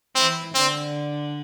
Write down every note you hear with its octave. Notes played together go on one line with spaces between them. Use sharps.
E3 C4 E4
D3 C4 D4